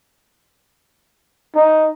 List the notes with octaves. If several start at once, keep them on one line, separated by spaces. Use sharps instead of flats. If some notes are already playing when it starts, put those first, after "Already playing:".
D#4